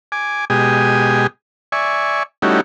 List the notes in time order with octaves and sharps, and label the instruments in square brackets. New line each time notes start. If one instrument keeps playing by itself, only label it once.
[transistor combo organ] G#5 D6
B2 G#3 G4 G#5 D#6
D5 E5 G#5 C#6
G3 A3 C#4 D#4 E4 F#4